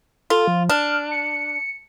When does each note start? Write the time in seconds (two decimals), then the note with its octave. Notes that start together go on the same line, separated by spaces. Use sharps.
0.30 F4 A4
0.47 F3
0.69 D4 F6
1.11 C#7